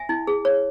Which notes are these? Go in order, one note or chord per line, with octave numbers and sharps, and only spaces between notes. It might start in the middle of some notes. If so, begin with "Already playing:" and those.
Already playing: E5 G#5
E4
G#4
C#5